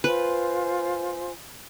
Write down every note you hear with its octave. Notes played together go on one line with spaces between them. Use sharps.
F4 B4 C5 G#5